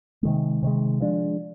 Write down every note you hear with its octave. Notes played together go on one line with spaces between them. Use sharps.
C3 D#3 G#3
C3 D#3 G#3
F3 G#3 D4